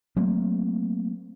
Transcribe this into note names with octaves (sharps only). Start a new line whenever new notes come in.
F#3 A3 A#3 C4